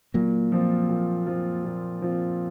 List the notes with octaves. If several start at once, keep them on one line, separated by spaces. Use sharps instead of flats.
A#2 F#3 A#3
F3 C4 F4
A#2
F3 C4 F4
A#2
F3 C4 F4